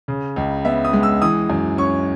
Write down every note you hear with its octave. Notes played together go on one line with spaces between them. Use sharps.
C#3
C#2
B3 E5
D#6
G#3
E6
E3 D#6
F#2
C#4 C#6